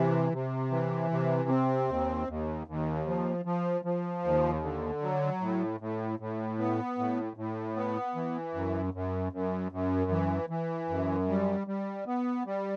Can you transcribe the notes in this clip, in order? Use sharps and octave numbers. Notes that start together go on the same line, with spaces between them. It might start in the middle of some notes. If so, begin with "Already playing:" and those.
Already playing: C3 E3
C3
E3
C3
C4
D#2
D#2
D#2
F3
F3
F3
D#2
D3
F#3
A2
A2
A2
B3
A2
A2
B3
E3
F#2
F#2
F#2
F#2
E3
E3
F#2
G3
G3
B3
G3